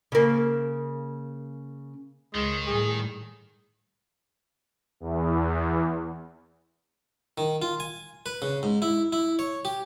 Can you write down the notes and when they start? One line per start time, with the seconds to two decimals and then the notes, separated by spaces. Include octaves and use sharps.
0.12 C#3 A#3
2.35 C#2 D#3 G#3
2.67 A2 G3 G#4
5.00 E2
7.38 D#3
7.62 F4
7.80 G#5
8.26 B4
8.42 C#3
8.63 G#2
8.82 E4
9.13 E4
9.39 C#5
9.65 G4